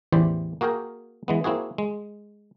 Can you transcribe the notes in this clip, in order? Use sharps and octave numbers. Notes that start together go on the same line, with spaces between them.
A1 E2 E3 G4 C5 D5
A#3 F#4 G#4 A#4 G5
E3 G#3 B3
A#3 C4 E4 F#4 G#4
G#3